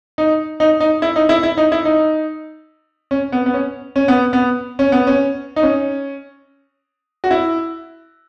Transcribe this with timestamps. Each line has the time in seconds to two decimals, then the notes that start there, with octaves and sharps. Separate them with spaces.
0.18 D#4
0.60 D#4
0.80 D#4
1.02 E4
1.16 D#4
1.29 E4
1.43 E4
1.57 D#4
1.72 E4
1.85 D#4
3.11 C#4
3.32 B3
3.46 B3
3.54 C#4
3.96 C#4
4.08 B3
4.33 B3
4.79 C#4
4.92 B3
5.07 C#4
5.56 D#4
5.63 C#4
7.24 F#4
7.31 E4